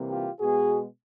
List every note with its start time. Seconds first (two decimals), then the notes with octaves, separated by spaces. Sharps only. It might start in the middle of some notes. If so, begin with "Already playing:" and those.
Already playing: C3 E3 G3 A#3
0.10 F4 G4
0.39 B2 G#3 B3 F#4 G#4